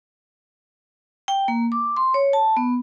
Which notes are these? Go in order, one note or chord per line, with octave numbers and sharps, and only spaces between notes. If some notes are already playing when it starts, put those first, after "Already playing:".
G5
A#3
D6
C6
C#5
A5
B3